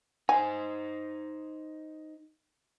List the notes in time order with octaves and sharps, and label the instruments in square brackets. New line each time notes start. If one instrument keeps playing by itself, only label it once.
[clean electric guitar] D#4 C5 [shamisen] G#5